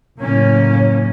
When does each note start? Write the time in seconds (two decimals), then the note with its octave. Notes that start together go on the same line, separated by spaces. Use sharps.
0.19 F#1 A2 A#3 C#4